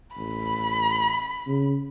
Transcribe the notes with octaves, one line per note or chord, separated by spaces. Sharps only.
A1 B5
C#3